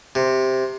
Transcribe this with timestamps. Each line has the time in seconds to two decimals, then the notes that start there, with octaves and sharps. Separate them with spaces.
0.15 C3